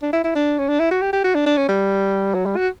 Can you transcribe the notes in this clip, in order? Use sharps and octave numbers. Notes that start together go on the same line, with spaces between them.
D4
E4
E4
D4
C#4
D4
E4
F#4
G4
G4
F#4
D4
D4
C#4
G3
F#3
G3
F#4